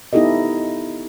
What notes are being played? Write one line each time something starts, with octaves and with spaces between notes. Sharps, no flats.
B3 D#4 E4 G4 A4 D#5